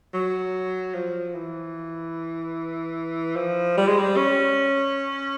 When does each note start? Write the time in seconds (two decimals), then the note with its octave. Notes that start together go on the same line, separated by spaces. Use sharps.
0.13 F#3
0.94 F3
1.35 E3
3.36 F3
3.77 G3
3.87 G#3
3.97 G3
4.16 C#4